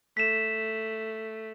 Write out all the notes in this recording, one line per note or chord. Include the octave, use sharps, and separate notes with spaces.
A3 B6 E7